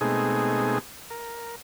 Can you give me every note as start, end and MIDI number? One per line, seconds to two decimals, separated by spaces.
0.01 0.78 47
0.01 0.78 56
0.01 0.78 57
0.01 0.78 60
0.01 0.78 63
0.01 0.78 68
1.10 1.56 70